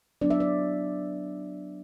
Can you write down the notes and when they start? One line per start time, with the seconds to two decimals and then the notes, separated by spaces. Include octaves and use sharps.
0.21 F#3 B3 D4 D5
0.30 E5
0.40 D5